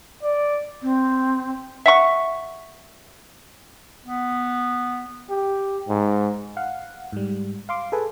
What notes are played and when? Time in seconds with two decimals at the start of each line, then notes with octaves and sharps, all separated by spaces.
0.23 D5
0.83 C4
1.86 E5 F#5 C#6
4.06 B3
5.30 G4
5.88 G#2
6.57 F5 F#5
7.12 G#2 G3
7.69 F5 C6 D6
7.92 G#4 A4 B4 G#5